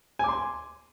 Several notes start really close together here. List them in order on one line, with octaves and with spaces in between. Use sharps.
G#5 D6 C6